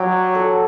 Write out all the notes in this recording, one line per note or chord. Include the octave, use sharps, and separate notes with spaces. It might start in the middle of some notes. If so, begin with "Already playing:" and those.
Already playing: F#3 G4
A4